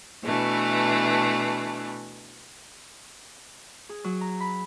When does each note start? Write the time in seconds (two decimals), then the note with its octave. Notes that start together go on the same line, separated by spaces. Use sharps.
0.23 B2 E3 A3 D4
3.89 G#4
4.04 F#3
4.21 A#5
4.40 B5